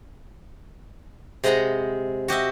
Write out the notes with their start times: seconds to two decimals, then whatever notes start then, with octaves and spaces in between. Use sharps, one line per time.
1.44 C3 G#3 D#5 F#5 A#5 B5
2.28 F#4 G4 D#5 E5